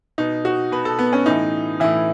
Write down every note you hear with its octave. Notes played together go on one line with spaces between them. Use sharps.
B2 D#4
F#4
B2 B4
A4
B3
C#4
A2 E3 D#4
A2 E3 E4